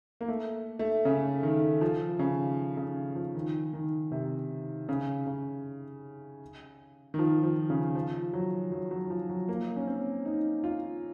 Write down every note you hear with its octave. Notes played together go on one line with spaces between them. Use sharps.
A#3
A3
A3
C#3
D#3
F3
C#3
C#3
F3
D#3
D#3
C3
C#3
C#3
D#3
F3
F3
C#3
F3
F#3
F#3
F#3
F3
F#3
A#3
C#4
C4
D#4
F4